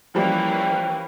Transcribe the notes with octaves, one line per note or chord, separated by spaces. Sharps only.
E3 F3 G3 A#3 C#4 G5